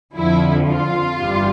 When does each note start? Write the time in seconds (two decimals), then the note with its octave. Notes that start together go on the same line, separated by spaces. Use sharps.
0.16 F2 D3 F3 E4
0.69 F4
1.20 G1 G2 E3 G3